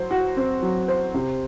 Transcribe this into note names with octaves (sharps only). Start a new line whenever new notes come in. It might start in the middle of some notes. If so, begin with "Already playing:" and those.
Already playing: F#3 C5
F#4
C4
F#3
C5
C3